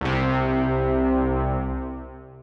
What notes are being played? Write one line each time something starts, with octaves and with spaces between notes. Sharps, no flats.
C2 C3